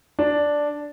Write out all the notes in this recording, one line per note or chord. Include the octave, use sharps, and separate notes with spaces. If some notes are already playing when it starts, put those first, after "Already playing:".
D4